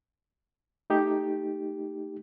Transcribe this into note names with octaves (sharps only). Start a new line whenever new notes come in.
A3 D#4 G4